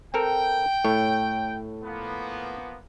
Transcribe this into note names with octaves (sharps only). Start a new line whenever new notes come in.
C4 A4 A#4 G5
A2 A3 C#5
F3 A#3 B3